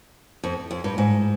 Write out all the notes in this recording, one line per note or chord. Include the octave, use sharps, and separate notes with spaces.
F2
F2
G2
G#2